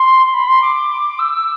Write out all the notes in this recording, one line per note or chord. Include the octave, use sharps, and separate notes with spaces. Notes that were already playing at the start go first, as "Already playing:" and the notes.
Already playing: C6
B5
C6
D6
E6